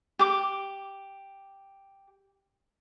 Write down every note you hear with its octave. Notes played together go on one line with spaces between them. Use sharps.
G4 D6